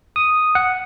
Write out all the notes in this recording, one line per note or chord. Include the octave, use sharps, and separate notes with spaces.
D#6
F#5